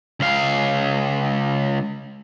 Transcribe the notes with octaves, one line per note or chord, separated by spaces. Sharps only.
C#2 F5